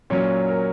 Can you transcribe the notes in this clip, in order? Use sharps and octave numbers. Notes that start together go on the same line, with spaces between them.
A#2 F#3 C#4 C#5
A#4